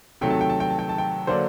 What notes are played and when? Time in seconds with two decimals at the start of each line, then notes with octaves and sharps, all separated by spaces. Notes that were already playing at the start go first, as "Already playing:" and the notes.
0.21 C3 D#3 F#3 A3 G5
0.30 A5
0.41 G5
0.50 A5
0.60 G5
0.70 A5
0.79 G5
0.89 A5
0.98 G5
1.27 D3 F#3 A#3 D4 C5